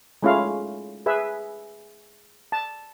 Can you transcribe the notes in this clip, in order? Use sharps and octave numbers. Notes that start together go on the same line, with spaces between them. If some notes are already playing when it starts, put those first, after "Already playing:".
G#3 A3 C#4 E4 F4 F5
G#4 B4 E5
A5